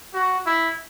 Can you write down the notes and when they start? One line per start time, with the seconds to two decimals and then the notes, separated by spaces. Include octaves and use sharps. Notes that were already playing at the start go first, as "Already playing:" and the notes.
0.14 F#4
0.46 E4